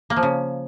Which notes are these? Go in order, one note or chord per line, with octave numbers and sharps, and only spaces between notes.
A#3
F3
C#3